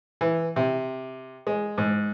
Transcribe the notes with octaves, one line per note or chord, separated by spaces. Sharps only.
E3
C3
G#3
G#2